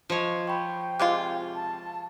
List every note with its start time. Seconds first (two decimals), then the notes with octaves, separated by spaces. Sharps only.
0.10 F3 F4 C5 C#5 D#5
0.47 G5 B5 C#6
0.99 C3 G#3 F4
1.55 A5